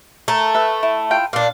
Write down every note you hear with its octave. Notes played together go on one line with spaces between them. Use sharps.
A3 A#4
B4 E5
E4
E4 F4 G5
A#2 D4 F5